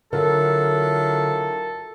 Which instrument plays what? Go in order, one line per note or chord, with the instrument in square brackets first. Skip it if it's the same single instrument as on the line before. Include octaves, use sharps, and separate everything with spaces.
[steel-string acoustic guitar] D3 [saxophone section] F#3 E4 F4 [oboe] A4 [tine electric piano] A#4